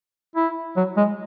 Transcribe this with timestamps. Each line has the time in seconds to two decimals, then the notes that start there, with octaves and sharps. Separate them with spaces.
0.36 E4
0.77 F#3
0.97 G#3